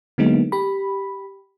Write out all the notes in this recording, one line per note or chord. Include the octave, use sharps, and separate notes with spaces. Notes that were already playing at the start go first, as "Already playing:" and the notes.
D3 F#3 G#3 A#3 B3 D#4
G4 B5